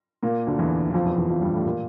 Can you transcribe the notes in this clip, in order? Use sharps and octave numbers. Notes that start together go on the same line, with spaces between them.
A#2 A#3
D2 D3
E2 E3
E3
F2 F3
E2 E3
E2 E3
F2 F3
G2 G3
A2 A3
A#2 A#3